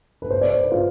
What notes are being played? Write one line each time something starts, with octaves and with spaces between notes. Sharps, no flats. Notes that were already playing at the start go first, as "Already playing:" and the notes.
B4
C5
D5
C5
B4
F4